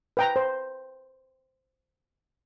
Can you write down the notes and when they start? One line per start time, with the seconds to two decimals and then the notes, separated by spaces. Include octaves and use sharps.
0.17 B4 G5 A#5
0.36 C5